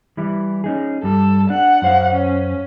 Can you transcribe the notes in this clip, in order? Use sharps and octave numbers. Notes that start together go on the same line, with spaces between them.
E3 G3 E4
C#4 D#4 G#4
G2 G3 A4
D4 F#5
F#2 C5 F5
C#4